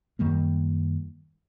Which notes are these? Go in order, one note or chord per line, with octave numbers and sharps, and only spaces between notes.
F#2 D#3 G3 A#3